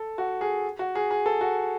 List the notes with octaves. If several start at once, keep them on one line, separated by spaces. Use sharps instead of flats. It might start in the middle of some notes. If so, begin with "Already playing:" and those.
Already playing: A4
F#4
G#4
F#4
G#4
G#4
A4
F#4